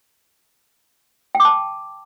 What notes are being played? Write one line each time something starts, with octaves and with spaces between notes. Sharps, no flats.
G5
D6
A5